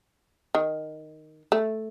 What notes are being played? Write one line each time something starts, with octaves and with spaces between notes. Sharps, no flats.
D#3
A3